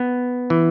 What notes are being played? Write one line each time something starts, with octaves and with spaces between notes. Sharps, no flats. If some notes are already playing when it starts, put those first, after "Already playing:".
Already playing: B3
E3